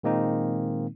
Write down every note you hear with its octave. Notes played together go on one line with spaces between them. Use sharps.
A#2 D#3 G#3 A#3 C4 D#4